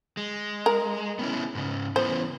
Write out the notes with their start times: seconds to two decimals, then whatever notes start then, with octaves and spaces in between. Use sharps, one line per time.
0.17 G#3
0.66 A#4
1.19 B3 C#4 E4
1.55 G#2 C#3
1.96 C#3 E3 B3 C5